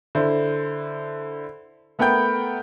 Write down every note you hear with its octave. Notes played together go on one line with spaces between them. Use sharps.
D3 E4 C5
A3 B3 A#4 F#5 G5 G6